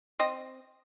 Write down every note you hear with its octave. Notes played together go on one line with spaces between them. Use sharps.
C4 D#5